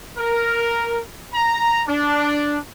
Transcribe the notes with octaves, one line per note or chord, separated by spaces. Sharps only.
A#4
A#5
D4